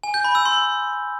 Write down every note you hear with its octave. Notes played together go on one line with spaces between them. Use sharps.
G#5
G6
B5
E6
C6